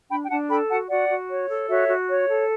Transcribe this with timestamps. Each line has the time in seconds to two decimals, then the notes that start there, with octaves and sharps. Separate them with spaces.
0.10 D4 G5 B5
0.24 G5
0.30 D4 F#5 A5
0.50 A4 G5 B5
0.69 F#4 F#5 A5
0.89 F#4 D5 F#5
1.10 F#4
1.30 C#5
1.49 A4
1.69 F#4 C#5 E5
1.89 F#4
2.08 C#5
2.28 A4